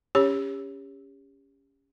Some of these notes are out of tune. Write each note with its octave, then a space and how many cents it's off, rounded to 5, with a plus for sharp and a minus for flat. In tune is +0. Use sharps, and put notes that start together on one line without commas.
C#4 +10 G4 +30 C#5 +0